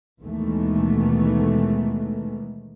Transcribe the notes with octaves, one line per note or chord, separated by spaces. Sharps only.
D#2 B2 D#3 E3 G#3 A3